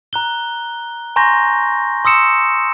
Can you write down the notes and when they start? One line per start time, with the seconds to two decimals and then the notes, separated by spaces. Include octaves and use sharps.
0.13 A#5 F#6 G7
1.16 G#5 A#5 C6 C#6 G6 A#6
2.05 C6 D#6 E6 C#7 E7